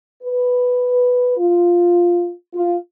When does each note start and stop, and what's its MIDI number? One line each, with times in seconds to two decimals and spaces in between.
0.23 1.33 71
1.38 2.32 65
2.54 2.76 65